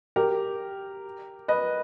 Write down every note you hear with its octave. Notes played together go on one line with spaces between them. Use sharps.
G4 A#4
B4 D#5